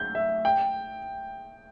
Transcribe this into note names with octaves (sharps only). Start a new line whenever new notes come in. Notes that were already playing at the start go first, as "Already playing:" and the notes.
Already playing: G6
E5
G5